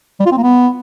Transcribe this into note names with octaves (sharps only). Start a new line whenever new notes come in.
G3
F4
C4
A#3
B3